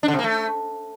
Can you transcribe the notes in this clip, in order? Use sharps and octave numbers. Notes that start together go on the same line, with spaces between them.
D4
D3
C3
A#3
A3